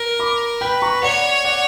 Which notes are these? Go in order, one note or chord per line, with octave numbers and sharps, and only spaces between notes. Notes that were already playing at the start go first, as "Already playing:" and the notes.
Already playing: A#4
B5 D6
B4 G5 B5
A#5 C#6
C#5 D5 F#5
D5 F#5